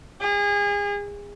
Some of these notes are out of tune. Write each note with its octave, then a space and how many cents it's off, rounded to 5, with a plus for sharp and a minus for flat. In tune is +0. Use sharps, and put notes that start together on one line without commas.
G#4 -30